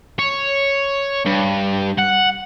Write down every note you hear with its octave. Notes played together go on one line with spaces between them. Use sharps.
C#5
G2
F#5